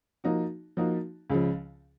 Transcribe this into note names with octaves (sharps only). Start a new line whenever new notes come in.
F3 A#3 D#4 F#4
F3 A#3 D#4 F#4
C#2 C#3 F3